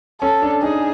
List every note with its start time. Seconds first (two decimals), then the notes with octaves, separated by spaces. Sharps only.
0.21 C#4 A4
0.42 D4
0.62 D#4 G#4